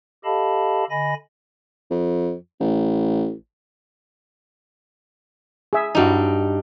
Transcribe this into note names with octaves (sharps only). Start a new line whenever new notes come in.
G4 A4 D#5 F5 A5 B5
D3 D#5 G#5 B5 A#6
F2
A1
G#4 E5
G2 D#4 E4 F#4